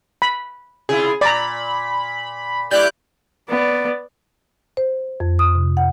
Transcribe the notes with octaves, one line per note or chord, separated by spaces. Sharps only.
B5
C3 E4 F4 G#4
A#2 D5 A#5 B5
A3 E4 G4 D5 D6 F#6 G6
B3 D5
C5
F2
D#6
C3
F#5